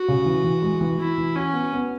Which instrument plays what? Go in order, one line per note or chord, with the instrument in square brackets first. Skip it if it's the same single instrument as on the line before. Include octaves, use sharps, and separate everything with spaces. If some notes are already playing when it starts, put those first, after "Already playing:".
Already playing: [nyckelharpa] F#4
[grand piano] C#3
E3
E3
G#3
E3
[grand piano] E3 [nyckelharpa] E4
[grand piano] E3
[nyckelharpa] C#4 [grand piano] F#4
[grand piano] B3
B3